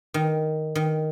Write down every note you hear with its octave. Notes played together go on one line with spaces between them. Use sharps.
D#3
D#3